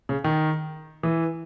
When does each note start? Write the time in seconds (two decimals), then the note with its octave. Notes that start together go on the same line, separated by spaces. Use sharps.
0.09 C#3
0.24 D#3
1.03 E3